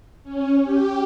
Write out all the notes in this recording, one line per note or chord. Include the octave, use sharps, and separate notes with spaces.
C#4
G4